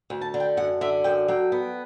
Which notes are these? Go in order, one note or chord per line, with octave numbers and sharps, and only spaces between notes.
D2
A5
D3
G5
F#2 F#5
D3 E5
F#2 G5
F#3 G5
B3